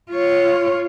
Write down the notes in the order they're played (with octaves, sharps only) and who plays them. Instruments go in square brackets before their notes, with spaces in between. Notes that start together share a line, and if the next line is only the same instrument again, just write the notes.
[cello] F4 C#5